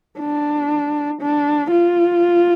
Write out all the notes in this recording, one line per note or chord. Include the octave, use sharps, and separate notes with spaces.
D4
D4
F4